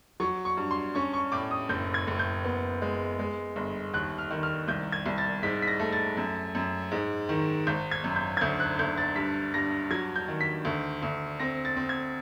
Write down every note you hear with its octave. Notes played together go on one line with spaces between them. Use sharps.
F#3 C#6
C#6
G2
C6
C#4 C#6
C#6
A2 D6
D#6
F#1 G6
G#6
F#1
G6
B3
G#3
G#3
G1
D#2 F#6
F6
D#3
F6
C2 G6
G#6
C2
A6
G#2 B6
B6
A#6
A3
A6
F#2
F#2
G#2
D#3
G#1 G6
G#6
F#2
G6
G#6
D2 G6
F#6
D2 G6
A6
G2 B6
G2 A#6
F#3 G#6
G6
D#3
B6
D2
D2
C4 A#6
A6
C4
G#6